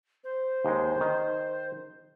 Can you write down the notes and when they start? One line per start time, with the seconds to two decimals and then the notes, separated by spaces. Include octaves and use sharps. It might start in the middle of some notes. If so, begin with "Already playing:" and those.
0.24 C5
0.65 D#2 G#3
1.01 D#3